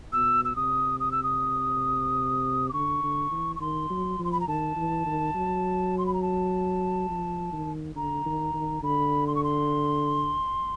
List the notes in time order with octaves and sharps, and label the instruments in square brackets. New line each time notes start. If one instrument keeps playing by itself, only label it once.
[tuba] B2 [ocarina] E6
[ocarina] E6
[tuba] C3 [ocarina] D#6
[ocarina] D#6
E6
D#6
D6
[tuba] D3 [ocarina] C#6
[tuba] D3
E3
[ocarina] C#6
[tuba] D#3 [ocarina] C6
[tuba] F#3
F3
[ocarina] C6
B5
A#5
[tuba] D#3 [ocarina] A5
[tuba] E3
D#3
F#3
[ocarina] C6
B5
A#5
A5
[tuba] F3
D#3
[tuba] D3 [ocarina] A#5
[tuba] D#3
D#3
[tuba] D3 [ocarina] B5
[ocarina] C6
C#6
C6